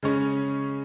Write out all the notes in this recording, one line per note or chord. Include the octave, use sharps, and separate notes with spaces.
C#3 G#3 C#4